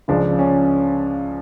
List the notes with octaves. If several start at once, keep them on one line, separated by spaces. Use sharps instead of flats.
C#2 C#3 F3 G#3 D4
C#4